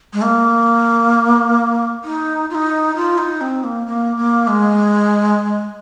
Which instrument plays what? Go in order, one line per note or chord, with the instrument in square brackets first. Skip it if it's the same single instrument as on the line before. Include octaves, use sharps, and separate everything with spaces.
[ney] G#3
A#3
D#4
F4
D#4
F4
D#4
C4
A#3
A#3
A#3
G#3